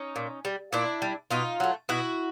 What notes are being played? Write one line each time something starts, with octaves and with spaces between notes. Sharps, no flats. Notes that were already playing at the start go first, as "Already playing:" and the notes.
Already playing: C#4 D#4
A#2
G3
A#2 D4 E4
G3
B2 D#4 F4
F#3 A3
B2 E4 F#4